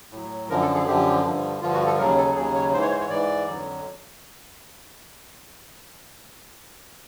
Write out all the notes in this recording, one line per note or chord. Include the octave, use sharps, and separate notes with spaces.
A2 F#3
F#2 D3 F3 A#4
A4
G#4
F#2 D3 F3 G4
G2 D3 F3
G2 D3 F3 F4
F#4
A4
D#2 C#3 F#3 A#4
A4
D#2 C#3 F#3 G#4
C#5
G#2 E3 C5
C#5
C5
C#5
G#2 E3 D5
F2 D3 F#3